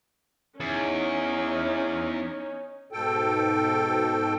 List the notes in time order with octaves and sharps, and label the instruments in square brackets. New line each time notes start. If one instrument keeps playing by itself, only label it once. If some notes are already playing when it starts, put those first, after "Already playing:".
[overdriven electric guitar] E2 [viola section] C#4 D#4
[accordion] G#2 B2 A4 G5